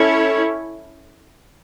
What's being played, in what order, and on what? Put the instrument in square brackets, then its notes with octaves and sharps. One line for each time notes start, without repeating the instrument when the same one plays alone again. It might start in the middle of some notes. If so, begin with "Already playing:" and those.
Already playing: [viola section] C#4 E4 A4 C#5